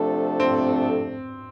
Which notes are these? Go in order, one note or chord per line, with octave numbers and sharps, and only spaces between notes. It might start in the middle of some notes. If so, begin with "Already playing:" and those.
Already playing: C3 F3 A3 D4 A4
C4